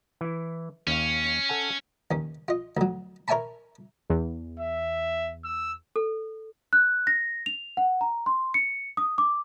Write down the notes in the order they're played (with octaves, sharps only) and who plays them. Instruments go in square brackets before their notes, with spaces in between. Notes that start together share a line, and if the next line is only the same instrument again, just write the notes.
[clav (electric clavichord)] E3 E4
[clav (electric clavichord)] D#2 F5 [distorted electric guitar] C#4
[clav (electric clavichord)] A4 F#5 G#5
[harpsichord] D#2 C#4
F4 D#5
D2 F#3
A#4 C#5 E5 G#5 A5 B5
[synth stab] E2
[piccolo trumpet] E5
E6
[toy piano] A4
[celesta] F#6
A#6
F7
F#5
A#5
C6
C#7
D#6
D6